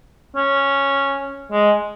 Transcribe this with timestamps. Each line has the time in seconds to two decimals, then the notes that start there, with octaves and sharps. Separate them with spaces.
0.36 C#4
1.52 G#3